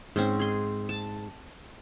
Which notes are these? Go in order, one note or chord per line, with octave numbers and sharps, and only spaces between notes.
G#2 C4 C#4 C5
G#4 C6
A5